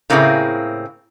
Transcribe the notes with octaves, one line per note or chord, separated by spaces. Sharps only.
A2 C#3 A#3 C4 E4 G#4